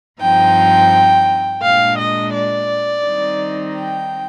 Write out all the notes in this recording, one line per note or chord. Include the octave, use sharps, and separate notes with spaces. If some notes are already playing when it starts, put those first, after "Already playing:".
G2 F3 C4 D#4 G5
A#2 G#3 D4 F5
D#5
D5
D#3 G3 C4 D#4
G5